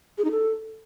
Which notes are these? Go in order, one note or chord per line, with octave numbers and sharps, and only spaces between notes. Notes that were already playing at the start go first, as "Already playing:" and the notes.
G#4
D#4
A4